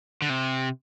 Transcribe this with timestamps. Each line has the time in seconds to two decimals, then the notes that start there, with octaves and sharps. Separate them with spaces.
0.22 D3
0.30 C3